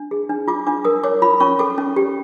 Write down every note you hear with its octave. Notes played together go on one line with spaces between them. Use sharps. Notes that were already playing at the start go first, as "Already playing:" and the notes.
Already playing: D4
G#4
D4
F4 D6
D4 D6
A#4 D#6
C#5 D6
F4 B5
C#4 C#6
A4 D6
C#4
G4